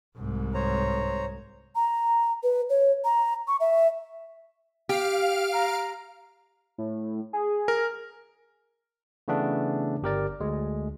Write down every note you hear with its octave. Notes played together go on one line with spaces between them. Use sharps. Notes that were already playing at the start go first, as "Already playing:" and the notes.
C2 G#2
C5 C#5 A#5
A#5
B4
C#5
A#5
C#6
E5
G4 F5 F6 D7
A#5
A2
G#4
A#4
C#3 E3 A3 B3 D4
G1 G4 A#4 D5
D2 G#3